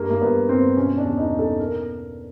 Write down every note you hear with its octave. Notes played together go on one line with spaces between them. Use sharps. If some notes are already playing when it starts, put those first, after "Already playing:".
Already playing: G2 A#3
A#3
G2 B3
G2 C4
B2 C#4
D4
E2
D#4
B2
A4
A#4